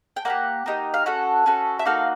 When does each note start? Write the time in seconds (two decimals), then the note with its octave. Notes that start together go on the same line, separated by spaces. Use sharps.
0.16 G5
0.25 A#3 D#4 G4 F#5
0.66 A#3 D#4 G4
0.94 F5
1.06 C#4 F#4 A4 F#5
1.46 C#4 F#4 A4
1.79 E5
1.86 A#3 D#4 F#4 A4 F5